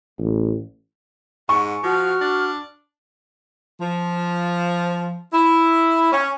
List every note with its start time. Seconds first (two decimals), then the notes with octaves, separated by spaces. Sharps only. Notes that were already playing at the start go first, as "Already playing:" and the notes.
0.19 A1
1.49 G#2 F#5 C#6
1.83 F3 F#4 F6
2.21 D4
3.81 F3
5.33 E4
6.12 C#4